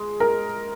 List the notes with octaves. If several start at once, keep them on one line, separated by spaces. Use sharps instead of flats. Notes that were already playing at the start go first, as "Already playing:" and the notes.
Already playing: G#3
A#4